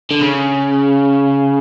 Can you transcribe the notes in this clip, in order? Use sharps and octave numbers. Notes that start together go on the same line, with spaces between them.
D3
C#3